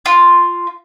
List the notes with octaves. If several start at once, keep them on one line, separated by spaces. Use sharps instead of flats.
F4